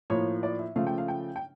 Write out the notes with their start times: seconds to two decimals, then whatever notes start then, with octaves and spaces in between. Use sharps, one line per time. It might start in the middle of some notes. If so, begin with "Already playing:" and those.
0.10 A2 F3 A#3 C#5
0.43 D5
0.59 E5
0.76 C#3 F3 A3 F5
0.87 G5
0.98 F5
1.08 G5
1.36 G5